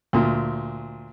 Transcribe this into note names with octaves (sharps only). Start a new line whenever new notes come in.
D2 A#2